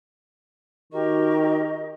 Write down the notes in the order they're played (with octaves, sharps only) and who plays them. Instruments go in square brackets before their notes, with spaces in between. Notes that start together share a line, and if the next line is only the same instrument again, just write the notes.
[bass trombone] D#3 [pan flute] F#4 [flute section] G4 A#4 C#6 [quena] D#5